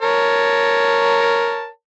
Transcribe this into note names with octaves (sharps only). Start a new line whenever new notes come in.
A#4 C#5 A5